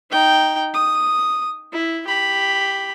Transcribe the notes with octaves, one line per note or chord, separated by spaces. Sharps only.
D#4 G5
D#6
E4
G4 B5